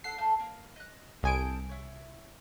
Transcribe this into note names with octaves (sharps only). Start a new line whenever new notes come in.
A4 F#5 C7
A3 A4 F5
A#3
D#5 F#6
C2 A4 C5 G#5 D#6 D7
E4 C#5